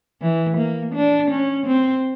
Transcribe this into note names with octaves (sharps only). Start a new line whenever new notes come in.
E3
A#3
D4
C#4
C4